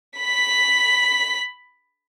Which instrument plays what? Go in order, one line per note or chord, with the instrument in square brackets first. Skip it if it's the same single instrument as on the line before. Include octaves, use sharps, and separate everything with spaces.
[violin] B5 B6